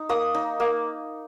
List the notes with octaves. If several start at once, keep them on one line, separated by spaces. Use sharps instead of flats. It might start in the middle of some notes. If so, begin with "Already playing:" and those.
Already playing: D#4
A#3 D#6
D#4
A#3